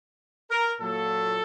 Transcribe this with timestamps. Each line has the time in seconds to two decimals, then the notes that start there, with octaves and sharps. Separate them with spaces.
0.51 A#4
0.79 A#2 F#3 A4